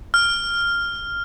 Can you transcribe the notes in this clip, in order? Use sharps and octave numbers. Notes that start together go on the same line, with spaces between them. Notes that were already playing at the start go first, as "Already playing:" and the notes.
F6